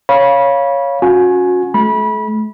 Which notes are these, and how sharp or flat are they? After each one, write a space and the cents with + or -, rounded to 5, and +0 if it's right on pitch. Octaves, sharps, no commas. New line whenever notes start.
C#5 +0 F5 +0 B5 -25
C#4 +0 F#4 -30 G#5 +15
A3 -40 B5 -25